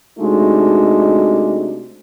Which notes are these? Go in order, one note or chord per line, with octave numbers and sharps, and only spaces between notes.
C3 G#3 A3 D4 D#4 F#4